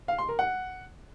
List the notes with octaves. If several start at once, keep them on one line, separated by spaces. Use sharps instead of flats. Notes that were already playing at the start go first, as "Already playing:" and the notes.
F5
C6
A#4
F#5